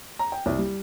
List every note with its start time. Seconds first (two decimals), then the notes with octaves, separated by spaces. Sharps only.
0.19 A#5
0.32 G5
0.46 C2
0.58 G3